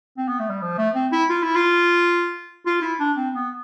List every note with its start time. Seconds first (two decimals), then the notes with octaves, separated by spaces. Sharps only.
0.17 C4
0.28 B3
0.39 A3
0.50 G3
0.62 F3
0.78 A3
0.95 C4
1.12 E4
1.29 F4
1.43 E4
1.56 F4
2.66 F4
2.82 E4
3.00 D4
3.17 C4
3.34 B3